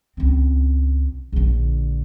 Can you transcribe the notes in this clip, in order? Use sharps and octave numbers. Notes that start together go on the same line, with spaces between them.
C#2 C4
A#1 D3